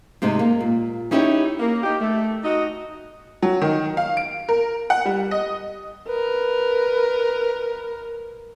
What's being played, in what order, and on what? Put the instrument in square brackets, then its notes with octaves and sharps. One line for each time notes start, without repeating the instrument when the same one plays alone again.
[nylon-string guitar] G#2 C3 A3 D#4
A#3
A#2
C#4 D#4 E4 G4 C5 C#5
[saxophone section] A#3
D#4 G4
A3
D#4 F#4 D#5
[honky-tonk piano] F#3
D#3
F5
D7
A#4
F#5
G3
D#5
[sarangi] A#4 [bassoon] B4